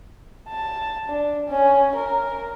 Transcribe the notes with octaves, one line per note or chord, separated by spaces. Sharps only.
A5
D4
C#4
A#4